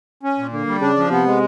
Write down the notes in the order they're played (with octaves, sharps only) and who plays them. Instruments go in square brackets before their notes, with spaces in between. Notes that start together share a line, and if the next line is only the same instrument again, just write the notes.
[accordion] C#4
A#2
[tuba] D3 [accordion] A#3
[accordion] G3
[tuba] C#3 [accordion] D4
[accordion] F3
[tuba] C3 [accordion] B3
[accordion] G#3